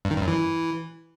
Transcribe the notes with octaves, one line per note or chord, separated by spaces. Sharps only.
G2
D#3
G2
F#2
E3